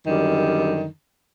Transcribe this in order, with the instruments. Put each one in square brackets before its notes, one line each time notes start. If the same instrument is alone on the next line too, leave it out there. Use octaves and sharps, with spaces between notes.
[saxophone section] F#2 D3 D#3 G3